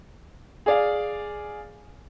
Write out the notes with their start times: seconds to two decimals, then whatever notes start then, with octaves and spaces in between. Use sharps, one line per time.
0.66 G#4 D5 F5